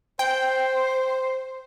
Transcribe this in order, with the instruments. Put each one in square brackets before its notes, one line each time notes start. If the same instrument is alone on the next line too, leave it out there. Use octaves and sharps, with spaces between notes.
[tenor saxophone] C5 [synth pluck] G5